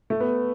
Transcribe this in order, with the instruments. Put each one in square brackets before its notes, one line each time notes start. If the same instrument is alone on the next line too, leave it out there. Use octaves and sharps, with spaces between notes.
[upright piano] A3
B3